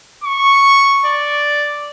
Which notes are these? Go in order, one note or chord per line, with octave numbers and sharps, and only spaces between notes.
C#6
D5